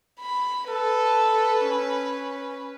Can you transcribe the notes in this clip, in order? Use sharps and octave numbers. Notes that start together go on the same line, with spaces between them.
B5
A4 B4
C#4